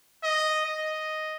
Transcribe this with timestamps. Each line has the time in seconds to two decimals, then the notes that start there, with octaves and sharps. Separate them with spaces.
0.24 D#5
0.65 D#5